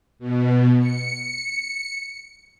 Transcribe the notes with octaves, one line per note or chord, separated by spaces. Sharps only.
B2
C#7